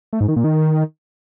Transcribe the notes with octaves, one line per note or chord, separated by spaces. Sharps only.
A3
G#2
D#3
A#2
D#3